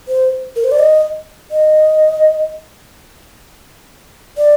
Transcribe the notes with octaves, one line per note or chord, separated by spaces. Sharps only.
C5
A#4
C5
D5
D#5
D#5
D5